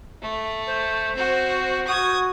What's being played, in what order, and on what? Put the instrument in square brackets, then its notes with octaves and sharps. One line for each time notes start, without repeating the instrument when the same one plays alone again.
[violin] A3
[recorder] C5
[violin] C4 F#4
[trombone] F#4 [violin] D#6 G#6